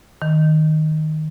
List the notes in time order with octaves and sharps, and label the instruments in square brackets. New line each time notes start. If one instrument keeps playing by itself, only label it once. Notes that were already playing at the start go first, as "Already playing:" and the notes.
[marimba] D#3